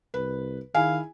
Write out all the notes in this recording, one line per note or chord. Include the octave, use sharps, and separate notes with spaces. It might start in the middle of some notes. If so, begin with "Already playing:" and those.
C2 B4
D#3 E4 G#4 F5 G#5